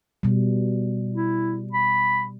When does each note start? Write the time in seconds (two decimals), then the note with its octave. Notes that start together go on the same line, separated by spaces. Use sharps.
0.23 B2 G3
1.14 E4
1.73 B5